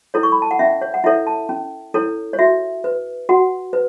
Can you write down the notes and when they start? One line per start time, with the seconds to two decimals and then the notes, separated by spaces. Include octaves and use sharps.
0.14 E4 A4 C#5
0.23 C#6
0.32 B5
0.42 A5
0.51 F#5
0.59 C#4 E5
0.81 C#5
0.94 F#5
1.04 E4 A4 C#5 E5
1.27 A5
1.49 C#4
1.94 E4 A4 C#5
2.33 C#5
2.39 F#4 E5
2.84 B4
3.29 F#4 F#5
3.73 B4